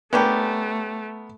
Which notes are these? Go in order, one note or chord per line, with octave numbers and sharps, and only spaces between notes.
A3 B3 C#4 D4 G4 A#4